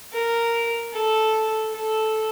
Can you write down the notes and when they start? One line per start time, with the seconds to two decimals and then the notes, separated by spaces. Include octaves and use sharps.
0.12 A#4
0.93 A4
1.74 A4